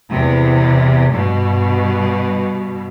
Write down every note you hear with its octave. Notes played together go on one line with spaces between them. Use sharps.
E2 C3
G2 B2